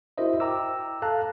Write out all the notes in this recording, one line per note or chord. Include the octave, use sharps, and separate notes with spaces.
E4 F#4 A#4 C5 D#5 E5
G5 A#5 D6 E6
A4 F5 A5 A#5 F#6